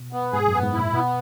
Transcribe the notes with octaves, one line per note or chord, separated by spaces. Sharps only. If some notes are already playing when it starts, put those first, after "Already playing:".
Already playing: B2
B3
G#2 G#4
F#2 B3
G#2
A#2 E4
B2 B3